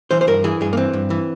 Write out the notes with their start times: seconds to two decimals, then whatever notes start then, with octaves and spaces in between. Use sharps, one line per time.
0.11 E3 C5
0.21 C5
0.27 G2 A#4
0.44 E3 G#4
0.61 G2 G#4
0.73 A#3
0.77 E3 C4
0.93 G2
1.10 E3